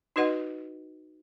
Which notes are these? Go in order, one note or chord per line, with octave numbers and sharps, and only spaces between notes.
D#4 F#4 B4 D#5 F#5